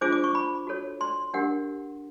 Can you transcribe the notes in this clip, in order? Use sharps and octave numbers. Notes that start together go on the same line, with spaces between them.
D4 F4 G#4 C5 D6
D6
C#6
B5
F#4 A4 C#5
C6
D4 G4 A#4 F#5